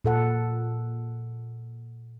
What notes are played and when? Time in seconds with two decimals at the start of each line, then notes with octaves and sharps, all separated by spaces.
0.05 A#2 A4 F#5